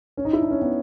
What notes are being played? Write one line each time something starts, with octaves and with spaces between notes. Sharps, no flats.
C#4
D#4
E4
D4
C#4
B3